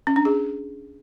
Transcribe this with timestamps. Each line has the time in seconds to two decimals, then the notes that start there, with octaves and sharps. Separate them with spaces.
0.07 C#4
0.16 D4
0.25 G#4